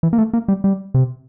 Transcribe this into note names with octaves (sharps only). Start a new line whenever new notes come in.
E3
A#3
A3
A#3
G3
G3
C3